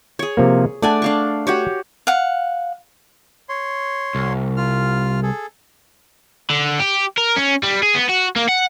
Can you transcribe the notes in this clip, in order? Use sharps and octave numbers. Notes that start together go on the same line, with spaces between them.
G#4 C#5
C3 F3 A#3
A3 D4 D5 F#5 G#5 A5
D4 F5 C#6
F#4 G4 C#5
F5 F#5
C#5 C6
C2
F4 F6
G#4 A4
D3
G4
A#4
C#4
G3
G#4
B3
F#4
A#3
F#5